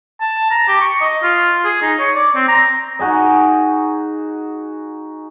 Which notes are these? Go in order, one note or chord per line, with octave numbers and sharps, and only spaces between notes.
A5
A#5
G4
C#6
D#5
F4
G#4
D#4
C#5
D5
C4
A#5
D#4 F#4 G#4 D#5